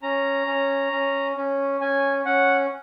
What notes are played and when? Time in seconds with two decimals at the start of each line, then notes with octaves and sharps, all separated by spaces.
0.02 C#4 A#5
0.47 C#4
0.92 C#4
1.36 C#4
1.81 C#4 G#5
2.25 C#4 F#5